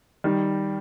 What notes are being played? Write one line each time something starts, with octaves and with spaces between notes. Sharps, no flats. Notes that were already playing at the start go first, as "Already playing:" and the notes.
D#3 G3